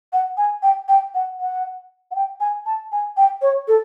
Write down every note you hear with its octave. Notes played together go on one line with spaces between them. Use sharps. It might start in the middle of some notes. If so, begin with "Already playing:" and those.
F#5
G#5
G5
G5
F#5
F#5
F#5
G5
G#5
A5
G#5
G5
C#5
A4